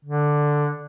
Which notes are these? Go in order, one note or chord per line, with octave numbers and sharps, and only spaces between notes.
D3